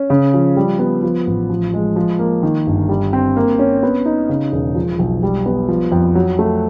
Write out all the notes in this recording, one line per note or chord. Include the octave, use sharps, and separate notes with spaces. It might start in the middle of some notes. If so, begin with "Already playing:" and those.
Already playing: C#4
C#3
F3
G3
B3
F3
A1
F3
G#3
F3
A#3
D#3
G1
G3
C4
A#3
C#4
B3
D#4
C#3
E1
F3
B1
G3
B3
F3
F2
F#3
A3